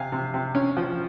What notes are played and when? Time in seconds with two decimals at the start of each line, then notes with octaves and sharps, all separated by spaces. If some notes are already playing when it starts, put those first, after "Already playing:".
Already playing: C3 F5 G#5
0.12 C3
0.34 C3
0.55 C#4
0.77 F3